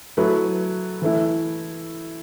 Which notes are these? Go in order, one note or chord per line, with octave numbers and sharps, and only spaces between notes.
F#3 A3 E4 B4
E3 A3 E4